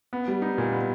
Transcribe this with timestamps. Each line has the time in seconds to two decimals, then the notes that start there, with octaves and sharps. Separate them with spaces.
0.13 B3
0.28 G3
0.42 D#4
0.58 A#2
0.72 B3